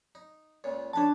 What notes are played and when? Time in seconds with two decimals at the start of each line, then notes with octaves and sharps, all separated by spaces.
0.15 D#4
0.64 C#2 A#2 C#3
0.93 F2 D4 B4 C#5 A5